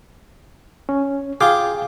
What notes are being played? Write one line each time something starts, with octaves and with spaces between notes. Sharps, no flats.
C#4
F4 G#4 F5 G5 D6